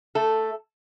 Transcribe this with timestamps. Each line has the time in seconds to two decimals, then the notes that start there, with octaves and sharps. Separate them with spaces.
0.15 A3 A4